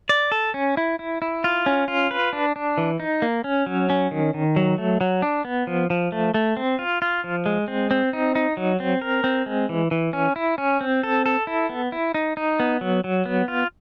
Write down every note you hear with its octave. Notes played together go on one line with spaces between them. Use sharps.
D5
A4
C#4
E4
E4
E4
F4
C#4
F4
B4
D4
D4
E3
D#4
A#3
C#4
F#3
C#4
D#3
D#3
F#3
A3
F#3
D4
B3
F3
F3
A3
A3
C4
F4
F4
F3
G#3
C4
C4
D#4
D#4
F#3
C4
A#4
C4
G#3
E3
E3
C#4
E4
C#4
C4
A4
A4
E4
B3
E4
D#4
D#4
B3
F#3
F#3
B3
F4